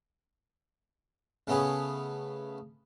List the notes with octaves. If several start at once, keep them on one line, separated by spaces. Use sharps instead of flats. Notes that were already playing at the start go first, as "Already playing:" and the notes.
C#3 A3 B3 C#4 G#4